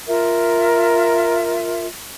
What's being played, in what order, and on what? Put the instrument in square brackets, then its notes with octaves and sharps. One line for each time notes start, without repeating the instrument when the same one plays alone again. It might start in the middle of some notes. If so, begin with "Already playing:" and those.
[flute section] F4 A#4 E5